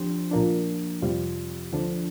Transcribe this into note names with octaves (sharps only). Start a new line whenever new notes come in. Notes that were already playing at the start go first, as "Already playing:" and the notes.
Already playing: F2 F3 D4 G4 C5
A#2 F3 A#3 D4
F2 C3 G3 C4 F4
D2 D3 F3 D4